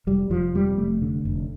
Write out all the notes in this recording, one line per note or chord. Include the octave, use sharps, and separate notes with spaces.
F1 G3
F1 F3
F2 G3
F1 A3
D3
F1